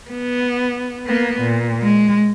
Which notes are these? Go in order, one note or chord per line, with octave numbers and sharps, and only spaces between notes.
B3
A#3 B3
A#2
G#3